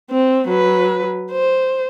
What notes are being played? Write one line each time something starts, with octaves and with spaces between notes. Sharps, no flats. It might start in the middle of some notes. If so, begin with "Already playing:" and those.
C4
F#3 B4
C5